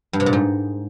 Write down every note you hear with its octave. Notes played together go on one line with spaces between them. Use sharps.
G2
C3
A#2
G#2